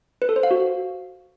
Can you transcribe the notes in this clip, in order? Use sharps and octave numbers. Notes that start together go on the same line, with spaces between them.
B4
A4
C5
F5
F#4